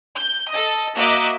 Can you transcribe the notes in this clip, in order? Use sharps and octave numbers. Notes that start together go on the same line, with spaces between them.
G6
A4 D#5
A#3 F#4 D#5 E5 D6 F#6